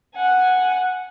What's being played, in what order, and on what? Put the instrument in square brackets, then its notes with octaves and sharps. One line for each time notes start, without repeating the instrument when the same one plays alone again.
[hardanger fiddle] F#5 G#5